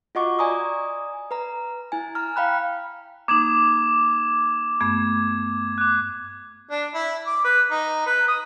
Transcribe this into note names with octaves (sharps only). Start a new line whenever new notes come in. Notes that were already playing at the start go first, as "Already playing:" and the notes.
F4 F#4 D#5 F#5 C#6 D6
D5 G#5 A#5 D#6
B4 A#5
E4 G#5
A#5 F6
F5 G5 B5 F#6
A#3 D#4 D6 G#6 E7
G2 A3 B3 G#6
D6 F#6
D4
E4
D6
B4
D#4
B4
D#6